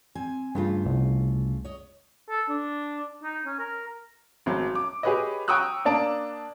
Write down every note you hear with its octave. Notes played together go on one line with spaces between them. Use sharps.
C4 G#5
G2 C#3 A3 F4
C2
C#5 D#5
A4
D4
D#4
C#4
A#4
G#1 F#3
D6
G4 G#4 B4 C#5 D#5
G5 A#5 C#6 D#6 E6 F#6
A#3 D4 D5 A5 D7